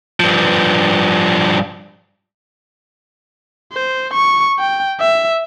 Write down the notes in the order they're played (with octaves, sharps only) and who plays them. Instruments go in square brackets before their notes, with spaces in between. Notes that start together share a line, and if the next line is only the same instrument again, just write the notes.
[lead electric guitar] G2 F3
[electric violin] C5
C#6
G5
E5